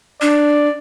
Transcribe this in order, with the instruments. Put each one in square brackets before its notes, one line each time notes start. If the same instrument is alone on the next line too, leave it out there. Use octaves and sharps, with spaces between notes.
[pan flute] D4 [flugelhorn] D5